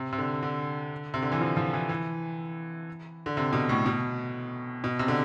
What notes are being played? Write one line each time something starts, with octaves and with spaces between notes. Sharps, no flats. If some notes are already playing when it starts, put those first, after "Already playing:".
Already playing: C3
C3
D3
D3
C3
D3
E3
F3
F3
E3
E3
D3
C3
B2
A2
B2
B2
C3
D3